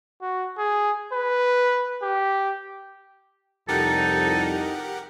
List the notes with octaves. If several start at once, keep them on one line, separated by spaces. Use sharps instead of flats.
F#4
G#4
B4
G4
C2 F2 D#4 G4 A4 A#4 F#5